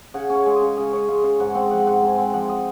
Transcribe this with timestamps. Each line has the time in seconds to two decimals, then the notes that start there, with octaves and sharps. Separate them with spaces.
0.14 C#3 F#5
0.30 C#4
0.35 F5
0.46 G#3
0.56 D#5
0.61 C#3
0.77 C#3 D#5
0.93 C#4 C#5
1.08 G#3 F5
1.24 C#3 F5
1.40 G#2 F#5
1.55 C4 F#5
1.71 F3 F#5
1.87 G#2 F#5
2.02 G#2 G#5
2.18 C4 F#5
2.34 F3 F#5
2.49 D#5